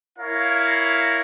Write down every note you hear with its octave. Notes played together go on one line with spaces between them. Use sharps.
E4 A#4 C#5 F5